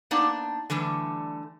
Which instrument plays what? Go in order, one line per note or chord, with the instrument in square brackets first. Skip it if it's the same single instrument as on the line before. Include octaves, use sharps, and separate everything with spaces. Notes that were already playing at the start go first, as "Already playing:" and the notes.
[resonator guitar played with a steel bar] A#3 B3 D4 D#4 D5 A5
D3 E3 G3 A3